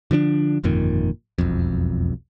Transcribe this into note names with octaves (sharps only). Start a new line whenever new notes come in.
D3 F3 B3 D4
G1 F2 A#2 D#3
E1 B1 F2